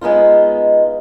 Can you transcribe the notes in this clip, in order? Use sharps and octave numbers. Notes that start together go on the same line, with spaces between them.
G#3 B3 D#4 F4